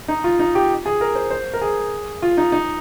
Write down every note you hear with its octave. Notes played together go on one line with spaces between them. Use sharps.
D#4
F4
D#4
G4
G#4
A#4
C5
C5
A#4
G#4
F4
D#4
D#4